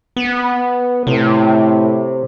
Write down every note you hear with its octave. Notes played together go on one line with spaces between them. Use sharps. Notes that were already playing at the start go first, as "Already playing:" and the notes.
B3
A2 C3